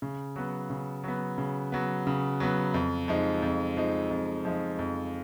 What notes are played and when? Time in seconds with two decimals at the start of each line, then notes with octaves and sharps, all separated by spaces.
0.02 C#3
0.36 F#3 B3
0.70 C#3
1.04 F#3 B3
1.38 C#3
1.72 F#3 B3
2.07 C#3
2.40 F#3 B3
2.74 F2
3.08 F3 G#3 D#4
3.42 F2
3.77 F3 G#3 D#4
4.11 F2
4.45 F3 G#3 D#4
4.79 F2